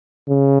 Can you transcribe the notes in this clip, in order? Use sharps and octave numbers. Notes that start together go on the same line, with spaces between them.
C#3